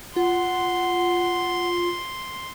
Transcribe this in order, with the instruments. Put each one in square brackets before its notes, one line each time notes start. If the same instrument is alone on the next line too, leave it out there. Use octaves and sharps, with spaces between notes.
[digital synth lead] F4 [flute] F#5 [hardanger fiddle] C6